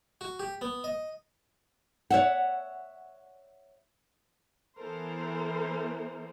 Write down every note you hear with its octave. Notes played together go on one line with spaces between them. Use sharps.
F#4
G4
B3
D#5
C#5 E5 F#5
E3 B3 A4 A#4 C5